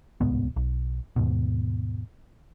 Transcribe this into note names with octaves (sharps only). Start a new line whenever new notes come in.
D1 C2 G#2 B3
B1
D#2 G#2 B2